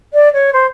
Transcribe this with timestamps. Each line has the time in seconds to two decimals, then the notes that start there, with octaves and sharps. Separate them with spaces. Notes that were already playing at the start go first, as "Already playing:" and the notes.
0.13 D5
0.33 C#5
0.52 C5